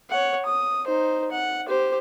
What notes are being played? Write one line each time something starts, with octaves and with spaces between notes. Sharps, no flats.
C#5 F#5
D#6
D#4 C5
F#5
G4 C5